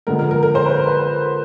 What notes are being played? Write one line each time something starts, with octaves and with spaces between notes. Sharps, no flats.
D3 F3 G#3 B3 A#4
A#4
A#4
A#4
C5
B4
A#4
B4